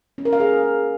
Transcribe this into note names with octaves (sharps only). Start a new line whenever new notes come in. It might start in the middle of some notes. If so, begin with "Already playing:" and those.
C#4
A#4
F5
G#4